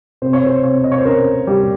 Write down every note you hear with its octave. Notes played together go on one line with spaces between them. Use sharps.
C3 C5
C#5
C5
C3 C#5
D#5
C#5
C5
C#4 A#4
G3 G4